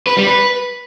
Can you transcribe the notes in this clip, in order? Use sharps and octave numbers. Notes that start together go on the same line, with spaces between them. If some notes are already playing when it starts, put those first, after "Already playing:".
B4
G3
B4